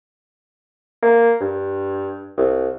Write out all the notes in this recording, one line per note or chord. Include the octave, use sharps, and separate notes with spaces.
A#3
G2
C2